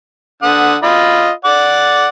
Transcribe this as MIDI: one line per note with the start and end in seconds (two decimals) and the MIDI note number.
0.43 0.76 50
0.43 0.76 78
0.43 0.76 87
0.83 1.31 65
0.83 1.31 75
0.83 1.31 83
1.45 2.07 74
1.45 2.07 78
1.45 2.07 86